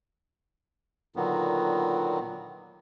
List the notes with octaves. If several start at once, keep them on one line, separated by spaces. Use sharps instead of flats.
A#2 D3 D#3 F#3 B3